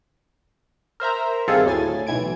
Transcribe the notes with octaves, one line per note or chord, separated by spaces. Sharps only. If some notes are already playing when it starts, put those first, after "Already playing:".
A#4 C5 E5 A#5
G1 C3 D#3 F4 G#4 A4
D2 A2 G#5 A6
B1 E3 G#6 D7